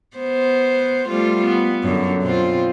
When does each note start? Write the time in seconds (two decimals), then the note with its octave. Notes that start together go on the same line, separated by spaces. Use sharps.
0.17 B3 C5
1.09 G3 A3 F4
1.45 B3
1.83 F#2 D3
2.22 B2 C4 F4